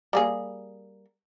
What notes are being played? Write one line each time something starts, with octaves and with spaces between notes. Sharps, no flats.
G3 A#3 G#4